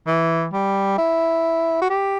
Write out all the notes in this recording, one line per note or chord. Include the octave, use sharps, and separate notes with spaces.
E3
G3
E4
F#4
G4